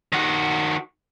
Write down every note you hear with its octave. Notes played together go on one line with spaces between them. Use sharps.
D#3 F#4